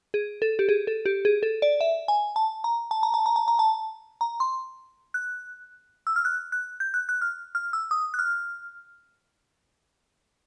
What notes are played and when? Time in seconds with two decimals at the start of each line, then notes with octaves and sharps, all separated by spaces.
0.14 G#4
0.42 A4
0.59 G4
0.69 G#4
0.87 A4
1.06 G4
1.25 G#4
1.43 A4
1.62 D5
1.81 E5
2.08 G#5
2.36 A5
2.64 A#5
2.91 A5
3.03 A#5
3.14 A5
3.26 A#5
3.36 A5
3.48 A#5
3.59 A5
4.21 A#5
4.40 C6
5.14 F#6
6.07 E6
6.16 F6
6.25 F#6
6.52 F#6
6.80 G6
6.94 F#6
7.09 F#6
7.21 F6
7.55 F6
7.73 E6
7.91 D#6
8.14 F#6
8.19 F6